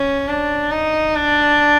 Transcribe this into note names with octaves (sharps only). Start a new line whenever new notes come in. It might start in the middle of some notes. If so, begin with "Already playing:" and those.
Already playing: C#4
D4
D#4
D4